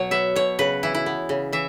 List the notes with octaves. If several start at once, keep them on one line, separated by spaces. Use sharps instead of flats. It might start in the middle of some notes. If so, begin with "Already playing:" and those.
Already playing: B2 F#3 C#5
B3 E5
B2 C#5
C#3 B4
E3 E4
E4
B3
C#3
E3 E5